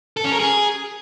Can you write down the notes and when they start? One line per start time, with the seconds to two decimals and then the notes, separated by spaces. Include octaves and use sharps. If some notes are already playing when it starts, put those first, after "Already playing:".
0.17 A4
0.24 C#4
0.32 A#4
0.39 G#4